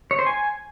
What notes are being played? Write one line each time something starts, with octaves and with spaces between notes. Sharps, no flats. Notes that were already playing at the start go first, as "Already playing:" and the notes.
C#5
C5
G#5